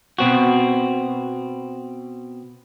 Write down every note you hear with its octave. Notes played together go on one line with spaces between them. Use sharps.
B2 C4 F#4